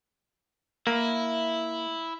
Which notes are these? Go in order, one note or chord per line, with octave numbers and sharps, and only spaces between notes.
A#3 E4